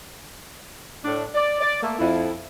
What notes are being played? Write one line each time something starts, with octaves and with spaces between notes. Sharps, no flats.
A2 D4
D5
D5
A3 A#3
F2 E4